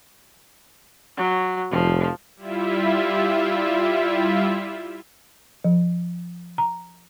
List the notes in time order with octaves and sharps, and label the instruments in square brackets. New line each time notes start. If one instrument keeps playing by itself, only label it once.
[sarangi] F#3
[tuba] F1 [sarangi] F3
[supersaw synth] G3 E4 F4 E5
[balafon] F3
A#5